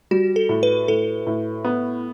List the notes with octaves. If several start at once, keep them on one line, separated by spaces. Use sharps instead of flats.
G3 F#4
A4
A2
B4
A2 A4
A2
B3